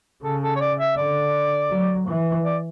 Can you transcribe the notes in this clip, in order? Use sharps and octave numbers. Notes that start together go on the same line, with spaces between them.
C#3 A4
A4
C#5
D5
E5
D3 D5
F#3
E3
D5